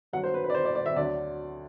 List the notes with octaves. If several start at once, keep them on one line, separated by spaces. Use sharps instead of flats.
G2 F#3 F#5
C5
B4
B4
D5
C5
D5
D5
E5
D2 D3 F#3 D5